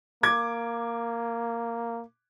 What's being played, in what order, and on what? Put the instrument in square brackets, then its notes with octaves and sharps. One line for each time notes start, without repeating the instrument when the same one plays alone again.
[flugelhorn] A#3 [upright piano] D6 G#6